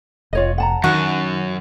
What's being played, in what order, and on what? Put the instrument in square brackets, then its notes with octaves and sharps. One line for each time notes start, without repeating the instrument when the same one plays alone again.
[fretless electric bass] F1 [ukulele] F4 C#5 D#5
[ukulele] F#5 A5 A#5
[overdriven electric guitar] F#2 [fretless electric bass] D#3 [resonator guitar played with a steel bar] F#4